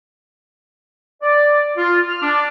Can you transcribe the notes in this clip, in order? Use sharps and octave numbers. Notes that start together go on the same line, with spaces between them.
D5
F4
F6
D4